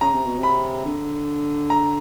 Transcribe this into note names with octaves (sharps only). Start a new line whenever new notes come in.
C#3 A#5
C3
B2
C3 B5
D3
A#5